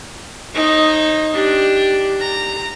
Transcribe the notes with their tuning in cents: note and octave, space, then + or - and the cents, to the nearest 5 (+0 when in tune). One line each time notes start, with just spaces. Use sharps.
D#4 +0 C5 +45
D4 +0 G4 +0
G4 +0 A#5 -15